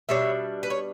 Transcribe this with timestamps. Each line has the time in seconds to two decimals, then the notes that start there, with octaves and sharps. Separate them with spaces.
0.09 B2 G3 D4 C#5 E5
0.63 B4
0.70 C#5